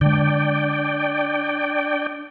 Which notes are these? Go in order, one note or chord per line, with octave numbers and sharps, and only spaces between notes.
D3 G#3 D4 D5 G5